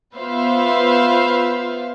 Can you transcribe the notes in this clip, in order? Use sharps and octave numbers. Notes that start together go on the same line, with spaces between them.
B3 F4 B4 C5 E5 F5